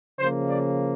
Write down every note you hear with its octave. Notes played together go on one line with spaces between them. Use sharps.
C#3 F3 A#3 C5
D5